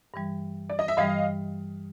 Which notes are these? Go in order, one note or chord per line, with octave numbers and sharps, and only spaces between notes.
G2 E3 G3
D5
D#5
E5
G2 E3 G3 D#5 F5